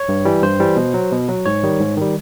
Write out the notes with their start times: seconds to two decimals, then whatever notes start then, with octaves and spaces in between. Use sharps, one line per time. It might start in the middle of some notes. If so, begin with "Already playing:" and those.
Already playing: C#5
0.09 G2
0.25 E3 G3
0.43 G2 C5
0.60 E3 G3
0.76 B2
0.94 F#3
1.12 B2
1.29 F#3
1.45 G#2 C#5
1.63 D#3 G3
1.80 G#2
1.97 D#3 G3